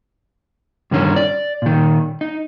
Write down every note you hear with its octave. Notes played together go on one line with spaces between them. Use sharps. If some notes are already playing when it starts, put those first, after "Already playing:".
G2 D3 D#3 C#4 E4
D5
A#2 D#3
D#4